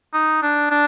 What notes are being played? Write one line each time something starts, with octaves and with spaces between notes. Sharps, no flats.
D#4
D4
D4